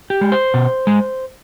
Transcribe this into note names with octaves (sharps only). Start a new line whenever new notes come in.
G4
G#3
C5
B2
G#3